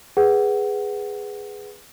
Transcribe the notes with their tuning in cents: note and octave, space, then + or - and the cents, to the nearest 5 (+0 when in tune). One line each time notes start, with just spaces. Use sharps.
G#4 -5 B4 +0 F#5 +15